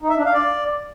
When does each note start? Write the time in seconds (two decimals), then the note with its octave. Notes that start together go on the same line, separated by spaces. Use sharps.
0.02 D#4
0.10 E5
0.17 D4
0.25 F5
0.33 D5